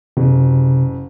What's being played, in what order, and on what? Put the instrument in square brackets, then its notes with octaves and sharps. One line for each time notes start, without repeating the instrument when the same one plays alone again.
[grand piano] F#1 [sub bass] C3